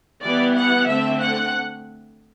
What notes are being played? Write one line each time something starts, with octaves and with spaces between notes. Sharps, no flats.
E3 G3 B3 D5
F#5
D3 A3 C4 E5
F#5